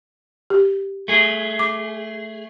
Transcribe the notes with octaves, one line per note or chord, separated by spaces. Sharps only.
G4
A3 G#4
D6